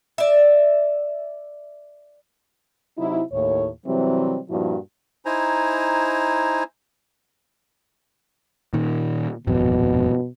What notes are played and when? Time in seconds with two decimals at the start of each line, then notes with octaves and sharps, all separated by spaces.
0.18 D5 E5
2.98 C3 F#3 D#4 E4
3.32 D#2 A2 C#5
3.86 C3 E3 F#3 G3 C4
4.50 G2 A#2 F3 A#3 E4 F#4
5.26 D#4 E4 C5 G#5 A#5
8.73 A#2 D#3
9.47 D#1 G#1 F2 B2